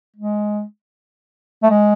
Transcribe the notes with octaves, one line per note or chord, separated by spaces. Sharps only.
G#3
A3
G#3